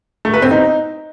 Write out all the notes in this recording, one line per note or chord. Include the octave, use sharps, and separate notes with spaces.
A3
B4
C4
D#4